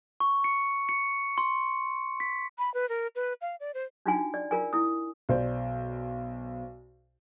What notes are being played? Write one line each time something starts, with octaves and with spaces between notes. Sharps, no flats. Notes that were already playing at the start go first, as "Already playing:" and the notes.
C#6
C#7
C#7
C6
B6
B5
B4
A#4
B4
F5
D5
C5
D4 D#4 F4 F#4 G5 G#5
D5
F4 A#4 D5 G#5
E4 D#6
B1 C5 D5